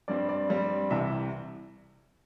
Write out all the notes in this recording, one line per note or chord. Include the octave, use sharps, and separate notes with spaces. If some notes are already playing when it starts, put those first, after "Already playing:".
G2 G3 C4 D5
D5
G2 G3 C4
C2 C3 E3 E5